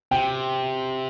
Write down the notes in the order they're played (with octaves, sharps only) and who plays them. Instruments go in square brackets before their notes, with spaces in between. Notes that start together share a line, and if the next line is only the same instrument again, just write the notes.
[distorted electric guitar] C3 [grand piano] G5